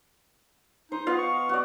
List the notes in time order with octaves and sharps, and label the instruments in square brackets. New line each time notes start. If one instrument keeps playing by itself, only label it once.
[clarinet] D#4 [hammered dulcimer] C5
[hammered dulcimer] B3 D#5 F5 [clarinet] F4
[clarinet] C#6
[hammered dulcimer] F#4 D5